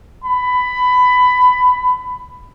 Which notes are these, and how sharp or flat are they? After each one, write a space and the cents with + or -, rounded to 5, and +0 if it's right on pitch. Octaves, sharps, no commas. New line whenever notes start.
B5 +15